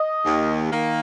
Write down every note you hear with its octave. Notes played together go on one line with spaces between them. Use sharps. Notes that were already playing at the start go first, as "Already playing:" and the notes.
Already playing: D#5
D#2
D#3 A#3